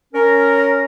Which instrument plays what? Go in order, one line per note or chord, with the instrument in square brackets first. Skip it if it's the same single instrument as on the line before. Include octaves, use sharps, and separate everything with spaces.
[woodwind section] C#4 A#4